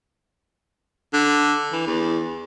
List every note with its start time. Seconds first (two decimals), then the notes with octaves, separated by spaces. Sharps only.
1.14 D3
1.72 E3
1.86 E2